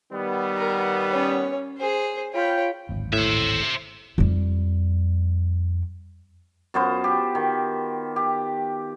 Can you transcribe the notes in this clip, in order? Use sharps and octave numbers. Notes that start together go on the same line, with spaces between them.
D#3 G3 B3
A#4
C#4 C#5
G#4 C5
F4 C#5 G5 B5
D1 G#1
A2 C5 E5
F2 G3
F#2 B3 F4 C5
G4
D#3
G4